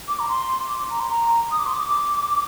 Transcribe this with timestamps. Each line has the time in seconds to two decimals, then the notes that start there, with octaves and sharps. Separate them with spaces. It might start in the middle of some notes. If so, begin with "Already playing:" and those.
0.08 D6
0.19 A#5
0.29 C6
0.69 D6
0.90 A#5
1.00 C6
1.10 A#5
1.51 D#6
1.59 D6
1.66 C6
1.74 D6